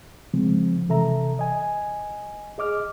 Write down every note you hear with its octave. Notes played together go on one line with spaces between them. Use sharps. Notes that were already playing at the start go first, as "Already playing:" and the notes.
C#3 F3 G#3 C4
C3 E3 A4 E5 A#5
D#5 G#5
G#4 D#5 D6 F6